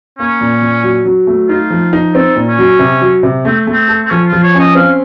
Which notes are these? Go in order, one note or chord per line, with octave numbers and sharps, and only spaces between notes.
A#3 C#4
A#2
A#2
F#3
F#3
A3
D#4 F4
F3
D#4
C4 A4
A#2
C#4
F#3
C3
F#3
C3
A3 C4
A3
C4
A4
C4
F3 C#4
F4
F3
C#5
C#4 D#5
C4 F5